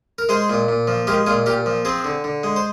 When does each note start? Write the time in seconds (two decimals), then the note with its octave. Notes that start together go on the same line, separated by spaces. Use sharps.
0.18 A#4
0.29 G#3 G#4 C5
0.49 A#2
0.68 A#2
0.87 F3
1.07 G#3 G4 A#4
1.26 A#2 F4 G#4
1.46 A#2 G4 A#4
1.66 F3
1.85 C4 G#4 C5
2.05 D3
2.24 D3
2.43 G#3
2.56 C5